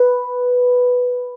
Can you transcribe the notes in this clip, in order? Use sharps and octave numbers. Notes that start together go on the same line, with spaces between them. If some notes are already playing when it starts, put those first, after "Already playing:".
Already playing: B4